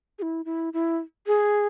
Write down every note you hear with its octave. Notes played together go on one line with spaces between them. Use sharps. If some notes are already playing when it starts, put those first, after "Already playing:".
G#4
E4
E4
E4
G#4